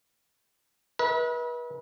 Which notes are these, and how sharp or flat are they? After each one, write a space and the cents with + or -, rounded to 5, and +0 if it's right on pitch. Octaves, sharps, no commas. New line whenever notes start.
B4 -35 E5 -45